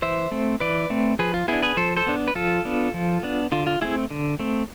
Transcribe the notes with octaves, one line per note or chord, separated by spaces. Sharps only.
E3 C5 E5
A3 C4
E3 B4 D5
A3 C4
F3 G#4 B4
F4
B3 D4 E4 G#4
G#4 B4
F3 A4 C5
A4 C5
B3 D4
B4
F3 F4 A4
B3 D4
F3
B3 D4
D3 F4
F4
A3 C4 E4 G#4
D3
A3 C4